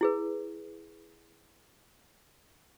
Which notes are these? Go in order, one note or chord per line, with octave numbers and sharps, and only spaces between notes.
E4 G#4 B4